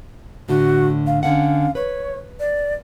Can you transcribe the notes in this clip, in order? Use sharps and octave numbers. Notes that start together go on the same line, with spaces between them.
A2 D3 F#4
F5
D3 C#4 F5 F#5
B4 C#5
D5